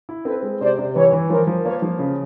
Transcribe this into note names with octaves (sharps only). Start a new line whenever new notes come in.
E4
C4 A4 B4
G#3
C3 C5 D5
C3
E3 B4 C#5
E3
F3 A#4 C5
F3
A#3 B4 C#5
F3
C#3